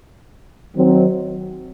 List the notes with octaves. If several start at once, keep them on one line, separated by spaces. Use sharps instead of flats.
D#3 F#3 C4